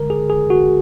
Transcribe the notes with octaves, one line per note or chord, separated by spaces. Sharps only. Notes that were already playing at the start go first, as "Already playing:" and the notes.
Already playing: D3 G#3 A#4
G#4
G#4
F#4